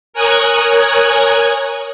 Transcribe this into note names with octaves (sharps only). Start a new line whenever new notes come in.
A#4 C#5 G#5 D#6 F#6 G#6